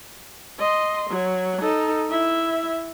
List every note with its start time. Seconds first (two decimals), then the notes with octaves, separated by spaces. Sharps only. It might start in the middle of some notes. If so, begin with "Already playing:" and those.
0.59 D#5 C6
1.10 F#3
1.61 D#4 A4
2.10 E4 E5